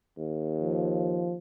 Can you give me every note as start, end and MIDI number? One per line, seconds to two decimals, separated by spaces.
0.18 1.37 39
0.60 1.36 53